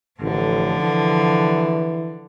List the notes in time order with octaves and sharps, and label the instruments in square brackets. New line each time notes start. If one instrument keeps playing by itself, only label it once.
[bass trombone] A1 [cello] D3 F3
[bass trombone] E3